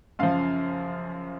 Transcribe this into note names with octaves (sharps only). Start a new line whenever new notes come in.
F#2 C#3 F3 F5